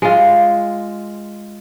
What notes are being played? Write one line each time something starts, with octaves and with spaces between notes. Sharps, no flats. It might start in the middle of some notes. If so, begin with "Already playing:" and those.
G#3 F4